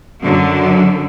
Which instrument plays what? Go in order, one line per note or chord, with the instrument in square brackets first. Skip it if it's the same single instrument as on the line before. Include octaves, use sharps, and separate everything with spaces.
[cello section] F#2 D3 F#3